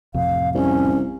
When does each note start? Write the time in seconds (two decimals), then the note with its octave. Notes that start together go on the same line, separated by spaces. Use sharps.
0.14 A1 F2 C3 F5
0.55 C2 C#4